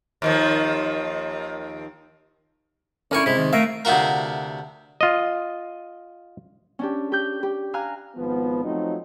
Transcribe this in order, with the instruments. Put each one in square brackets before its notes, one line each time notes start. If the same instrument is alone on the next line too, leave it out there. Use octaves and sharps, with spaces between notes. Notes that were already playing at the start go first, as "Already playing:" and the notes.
[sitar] D#2 D#3 F3
[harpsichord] D3 A#4 C#6 [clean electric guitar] C#4 E4
[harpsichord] C3 G#3 [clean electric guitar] E4
[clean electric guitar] D#3
[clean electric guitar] A3 A#4 F5 [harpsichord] E5
[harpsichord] D2 C3 F4 F#4 A#4
[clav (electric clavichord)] F4 D#5
[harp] C#4 D4 G4
G4 G6
G4
F5 G#5 A#5 F6 F#6
[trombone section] G#1 F3 B3
F3 F#3 A3 C4 D#4